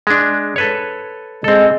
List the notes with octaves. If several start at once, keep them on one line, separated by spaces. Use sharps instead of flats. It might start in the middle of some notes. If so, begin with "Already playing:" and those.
G#3 D4
A4 B4 C#5
G#3 C4 A4